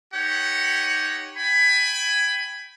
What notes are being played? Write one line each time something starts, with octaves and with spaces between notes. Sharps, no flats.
D#4 G4 C#5 F#5
G5 G#5 B5